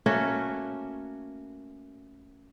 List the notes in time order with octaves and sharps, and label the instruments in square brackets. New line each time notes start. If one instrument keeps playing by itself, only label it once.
[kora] A3 A#3 C#4 F#4